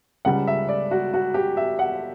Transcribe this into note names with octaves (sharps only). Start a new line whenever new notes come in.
C#2 C#3 G3 F#5
E5
D5
F#4
F#4
G4
E5
F#5